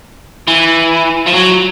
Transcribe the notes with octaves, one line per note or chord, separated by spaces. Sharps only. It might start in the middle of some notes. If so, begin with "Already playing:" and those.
E3
F3
F#3